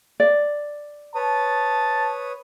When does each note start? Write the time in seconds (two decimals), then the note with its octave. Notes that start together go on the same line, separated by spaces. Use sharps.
0.20 D5
1.15 B4 C#5 A5 D#6